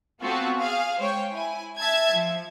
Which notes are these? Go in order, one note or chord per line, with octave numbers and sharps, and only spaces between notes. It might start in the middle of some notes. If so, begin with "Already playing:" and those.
B3 C4 F4 F#4 A4
G#4 F5
G#3 C5 C#5 G5
E4 G#5
E5 A5 E6 G#6
F3